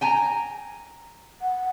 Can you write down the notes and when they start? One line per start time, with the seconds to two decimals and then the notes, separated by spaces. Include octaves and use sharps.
0.01 G5 G#5 A#5
1.41 F#5